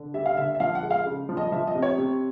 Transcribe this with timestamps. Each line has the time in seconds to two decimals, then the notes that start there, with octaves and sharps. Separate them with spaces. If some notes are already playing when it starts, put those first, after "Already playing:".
Already playing: D3
0.14 G3 E5
0.26 F5
0.37 D3 E5
0.55 E5
0.60 F3 F5
0.75 F#5
0.83 G#3
0.91 F5
1.06 C#3
1.29 F3
1.37 D#5
1.52 F3 E5
1.67 D#5
1.75 C3
1.82 C#5
1.98 C3